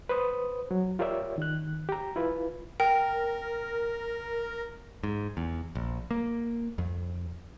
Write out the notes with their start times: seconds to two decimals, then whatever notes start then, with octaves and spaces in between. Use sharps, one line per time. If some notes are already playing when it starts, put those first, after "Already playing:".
0.09 B4 C5 D#6
0.71 F#3
0.99 F4 G4 A#4 C#5 D5 E5
1.38 D#3 F#6
1.89 G4 A#5
2.16 E4 F4 B4
2.80 A#4 G5
5.03 G#2
5.37 E2
5.75 A#1
6.11 A#3
6.78 F2